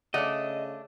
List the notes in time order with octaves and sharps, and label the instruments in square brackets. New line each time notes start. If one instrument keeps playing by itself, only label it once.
[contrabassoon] C#3 [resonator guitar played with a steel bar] A3 D4 [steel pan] D5 F#5 [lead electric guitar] D#5